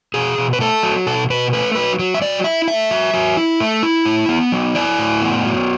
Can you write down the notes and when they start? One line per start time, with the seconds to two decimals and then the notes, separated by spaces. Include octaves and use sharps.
0.14 B2 G#4
0.38 B2
0.53 B4
0.60 A3 A4
0.83 F#3
1.07 B2 A4
1.30 B2 B4
1.53 A3 B4
1.75 F#3 B4
1.99 F#3
2.14 E5
2.22 F#3 D5
2.44 E4 E5
2.68 A3 E5
2.91 F#3
3.13 F#3
3.37 E4
3.60 A3
3.83 E4
4.05 A2
4.29 B3
4.52 F#3
4.75 E4 D5
4.99 A2
5.22 B3
5.45 F#3